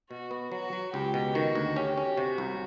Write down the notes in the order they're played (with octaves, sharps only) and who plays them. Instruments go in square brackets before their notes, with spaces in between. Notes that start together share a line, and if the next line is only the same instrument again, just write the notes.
[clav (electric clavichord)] B2 [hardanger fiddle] F#4
[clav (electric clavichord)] B3
[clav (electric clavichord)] F#3 [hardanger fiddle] F#4
[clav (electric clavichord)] F#3
[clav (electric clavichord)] C#2 [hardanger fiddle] G4
[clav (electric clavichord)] B2
[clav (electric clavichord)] D#3 [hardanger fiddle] F#4
[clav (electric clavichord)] D2
[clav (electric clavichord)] C#4 [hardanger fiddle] G4
[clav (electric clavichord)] C#4
[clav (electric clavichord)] C3 [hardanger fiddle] F#4
[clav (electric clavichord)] C2